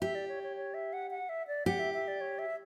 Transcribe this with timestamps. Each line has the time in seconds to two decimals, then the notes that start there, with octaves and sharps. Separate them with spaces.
0.01 G4 E5
0.15 D5
0.28 C#5
0.43 C#5
0.57 C#5
0.74 E5
0.93 F#5
1.11 F#5
1.29 E5
1.48 D5
1.66 G4 F#5
1.79 E5
1.94 E5
2.08 D5
2.21 C#5
2.39 E5